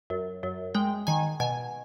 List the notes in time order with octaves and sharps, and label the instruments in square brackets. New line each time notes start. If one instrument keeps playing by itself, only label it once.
[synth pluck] F#2
F#2
G#3 G5
D#3 G#5
B2 G#5